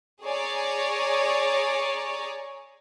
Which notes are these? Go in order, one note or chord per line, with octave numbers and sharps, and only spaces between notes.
G#4 C#5 D5 G#5 A#5